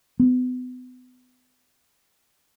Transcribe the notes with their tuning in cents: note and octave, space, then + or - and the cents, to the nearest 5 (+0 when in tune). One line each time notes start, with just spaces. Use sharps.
B3 +35